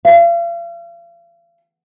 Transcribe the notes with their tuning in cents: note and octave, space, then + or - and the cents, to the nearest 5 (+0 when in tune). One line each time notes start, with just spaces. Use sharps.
F5 -40